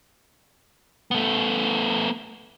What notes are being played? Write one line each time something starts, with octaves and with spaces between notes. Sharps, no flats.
A3 B3